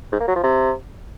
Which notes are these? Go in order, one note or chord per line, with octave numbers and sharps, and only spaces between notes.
G#2
A#3
F#3
F3
C3